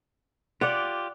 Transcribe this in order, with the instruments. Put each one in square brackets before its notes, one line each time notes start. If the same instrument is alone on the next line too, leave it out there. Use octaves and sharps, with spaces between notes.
[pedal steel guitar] F4 G4 [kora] D5 F#5